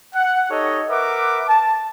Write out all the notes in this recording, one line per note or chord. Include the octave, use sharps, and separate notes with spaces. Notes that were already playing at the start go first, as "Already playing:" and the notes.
F#5
D#4 G4 A4 C#5 D#5
A#4 B4 E5 F#5 D6
A5